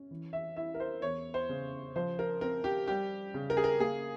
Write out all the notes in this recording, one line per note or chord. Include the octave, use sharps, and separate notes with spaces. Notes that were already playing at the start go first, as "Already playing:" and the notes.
Already playing: C#4
E3
E5
E4 E5
A#4
C5
E2 C#5
C5
C#3
F3 C5
A#4
C4 A#4
G4
G3 G4
C#3
A#4
G#4
A#4
A#3 G#4